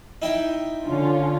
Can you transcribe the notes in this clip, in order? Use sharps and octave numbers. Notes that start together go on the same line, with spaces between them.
D#4 E4 G5
D3 C#4 D4 F4